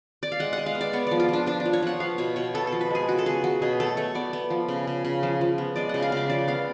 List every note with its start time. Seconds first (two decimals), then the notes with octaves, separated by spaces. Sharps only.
0.23 D5
0.32 F5
0.40 G#3 F#5
0.53 F#5
0.58 G#3
0.66 F5
0.75 B3
0.81 D5
0.93 B3 C#5
1.07 F3 D5
1.20 F4
1.29 F3 D4
1.46 F3 D4
1.60 D4
1.66 F3
1.73 C#5
1.82 F3 F#5
2.00 B3 F5
2.18 B2 C#5
2.36 B2 C#5
2.55 B3 A4
2.67 A4
2.72 F3
2.81 B4
2.90 G#3 G#4
3.07 C#3 F#4
3.18 A4
3.26 B3 G#4
3.44 F#3 F#4
3.62 B2 G#4
3.80 A3 A4
3.97 A3 C#5
4.15 B3 D5
4.33 B3
4.50 F3
4.68 C#3
4.87 C#3
5.05 C#3
5.23 F3
5.41 F3
5.58 B3
5.76 G#3 D5
5.89 C#3 F#5
6.02 F5
6.12 C#3 D5
6.30 F3 D5
6.48 B3 F5